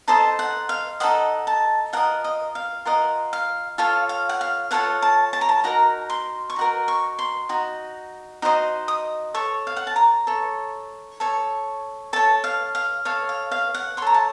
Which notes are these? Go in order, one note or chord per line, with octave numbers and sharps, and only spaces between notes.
D#4 A4 C5 D#5 A5
F#5
F5
D#4 A4 C5 D#5 F#5
A5
F4 A#4 D#5 F#5
D#5
F5
F4 A#4 D#5 F#5
F5
F4 A4 C#5 F5
F5
F#5
F5
F4 A4 C#5 F#5
A5
A5
A#5
A5
D#4 F#4 A#4 A#5
C6
C#6
D#4 F#4 A#4
C#6
C6
D#4 F#4
D#4 F#4 C5 D#5
D#6
A4 C#5 C#6
F5
F#5
A5
A#5
A4 C#5
A4 C#5
A4 C#5 A5
F5
F5
A4 C#5 F5
F5
F5
F#5
A4 C#5 A#5 C6
A5